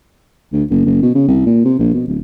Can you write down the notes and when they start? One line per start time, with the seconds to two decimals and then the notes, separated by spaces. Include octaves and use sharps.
0.53 D2
0.71 F#1
0.86 F#1
1.03 B2
1.15 C#3
1.28 C2
1.46 A#2
1.65 C3
1.79 A#1
1.94 B2
2.08 D1